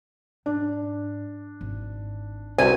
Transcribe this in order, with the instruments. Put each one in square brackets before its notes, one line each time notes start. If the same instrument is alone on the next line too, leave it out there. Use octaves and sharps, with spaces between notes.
[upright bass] G#2 [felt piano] D4
[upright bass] G#1
[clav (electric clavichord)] C2 [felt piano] C4 F#4 B4 [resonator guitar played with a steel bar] G#5